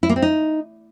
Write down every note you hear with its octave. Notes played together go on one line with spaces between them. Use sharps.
E4
A#3
C4
D#4